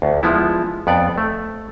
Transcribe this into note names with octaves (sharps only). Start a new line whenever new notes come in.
D2
F3 G#3 B3 E4
F2 B3 D5
A3